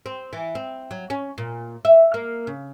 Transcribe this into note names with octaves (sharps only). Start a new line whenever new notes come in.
C4
E3
C4
F#3
C#4
A#2
E5
A#3
C#3